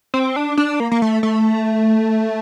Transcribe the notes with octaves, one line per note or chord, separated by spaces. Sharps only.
C4
D4
D4
A#3
A#3
A3
A3